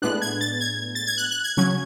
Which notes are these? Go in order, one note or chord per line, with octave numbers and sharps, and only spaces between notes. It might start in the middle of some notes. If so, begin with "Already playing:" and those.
A2 G#3 B3 D4 F#6
G#6
A6
G#6
A6
G#6
F#6
F#6
G#6
C#3 F#3 C#4 G#6